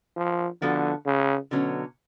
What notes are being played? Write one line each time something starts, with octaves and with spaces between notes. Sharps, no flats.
F3
D3 F3 B3 F#4 A4
C#3
B2 D3 F#3 C#4